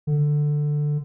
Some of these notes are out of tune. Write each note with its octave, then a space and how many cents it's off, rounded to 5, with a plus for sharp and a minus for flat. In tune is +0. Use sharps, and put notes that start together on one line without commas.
D3 +10